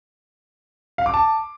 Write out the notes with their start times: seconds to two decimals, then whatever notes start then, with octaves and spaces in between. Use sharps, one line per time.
0.98 F5
1.06 D6
1.14 A5